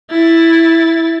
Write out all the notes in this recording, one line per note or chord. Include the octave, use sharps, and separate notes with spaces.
E4 A6